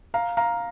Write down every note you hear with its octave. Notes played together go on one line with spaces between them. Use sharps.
F5 A#5
F5 A#5